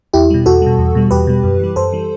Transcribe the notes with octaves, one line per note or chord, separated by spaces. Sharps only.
E2 E4 G4
B2 G3
E2 F#4 A4
B2 G3
E2
B2 G3
E2 G4 B4
B2 G3
F#2
E3 G3
F#2 A4 C5
E3 G3